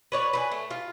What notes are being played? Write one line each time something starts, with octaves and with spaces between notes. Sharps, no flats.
B4 C#5 D5
B4 C5 G#5
A3
F4